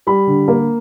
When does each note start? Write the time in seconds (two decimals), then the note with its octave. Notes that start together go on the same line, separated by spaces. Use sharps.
0.07 G3 B5
0.27 D3
0.48 A#3